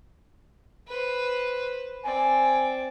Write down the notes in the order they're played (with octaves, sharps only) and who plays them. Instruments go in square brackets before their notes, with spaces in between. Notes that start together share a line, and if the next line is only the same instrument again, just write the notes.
[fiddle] B4 C5
[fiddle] C4 D5 [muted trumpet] G#5